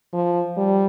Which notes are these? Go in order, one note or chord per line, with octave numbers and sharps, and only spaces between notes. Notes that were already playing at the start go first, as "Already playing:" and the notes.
F3
G3